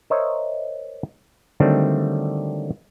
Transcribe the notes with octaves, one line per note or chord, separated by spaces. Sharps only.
A#4 C5 C#5 D#5 E5
D3 D#3 F#3 G3 A3 C4